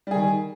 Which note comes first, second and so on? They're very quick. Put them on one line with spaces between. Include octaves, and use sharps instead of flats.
G3 G#4 D#3